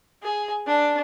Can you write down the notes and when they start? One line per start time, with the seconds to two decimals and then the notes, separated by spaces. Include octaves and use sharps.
0.23 G#4
0.67 D4